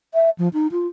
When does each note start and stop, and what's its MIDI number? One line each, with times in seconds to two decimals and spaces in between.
0.14 0.30 76
0.38 0.49 53
0.53 0.67 63
0.72 0.87 65